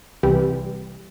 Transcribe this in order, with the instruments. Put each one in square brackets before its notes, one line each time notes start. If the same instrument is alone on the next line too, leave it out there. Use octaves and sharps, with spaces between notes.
[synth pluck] C2 C3 E3 G3